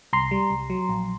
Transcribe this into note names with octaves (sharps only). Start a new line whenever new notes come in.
C2 A#5 C6
G3
C2
F#3
A#1